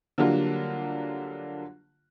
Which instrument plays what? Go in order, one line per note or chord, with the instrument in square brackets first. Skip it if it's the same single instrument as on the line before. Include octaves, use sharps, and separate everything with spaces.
[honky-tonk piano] D3 F#3 G3 A#3 D4 F4